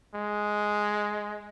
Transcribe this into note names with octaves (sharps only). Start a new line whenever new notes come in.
G#3